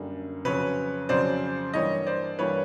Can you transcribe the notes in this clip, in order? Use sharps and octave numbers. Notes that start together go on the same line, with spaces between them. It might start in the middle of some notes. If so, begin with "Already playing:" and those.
Already playing: F#2 D3 G3 A#3
F2 C#3 F#3 B4 C#5
F2 C#3 F#3 C5 D5
G2 E3 G3 A#3 C#5 D#5
C5 D5
G2 E3 G3 A#3 B4 C#5